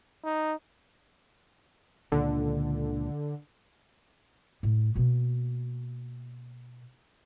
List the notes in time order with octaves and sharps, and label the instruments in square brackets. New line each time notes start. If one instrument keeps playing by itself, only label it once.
[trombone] D#4
[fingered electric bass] C#2 A#2 [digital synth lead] D3
[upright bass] A2
B2 A#3